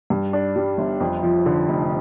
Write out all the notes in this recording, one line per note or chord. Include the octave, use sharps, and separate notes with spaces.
G2
D4
G3
G1
F2
F3
D3
F1